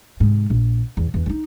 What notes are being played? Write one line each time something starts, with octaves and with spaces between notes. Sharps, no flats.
G#2 C3
A#1
E2
E2
D4 D#4